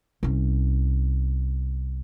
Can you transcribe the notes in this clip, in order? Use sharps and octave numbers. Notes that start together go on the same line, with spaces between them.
C2 C#4